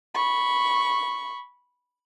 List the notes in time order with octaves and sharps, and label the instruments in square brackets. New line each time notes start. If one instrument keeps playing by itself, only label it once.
[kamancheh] B5 C#6